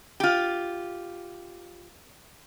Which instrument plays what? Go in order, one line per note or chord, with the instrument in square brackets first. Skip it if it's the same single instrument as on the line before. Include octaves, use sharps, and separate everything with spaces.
[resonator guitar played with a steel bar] F4 G4